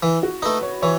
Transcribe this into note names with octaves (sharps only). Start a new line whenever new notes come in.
E3 E4
F#4
A3 D#4 B4
C#5
E3 C#5